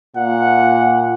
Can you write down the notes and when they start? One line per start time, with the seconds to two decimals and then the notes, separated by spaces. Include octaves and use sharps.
0.16 A#2 F#5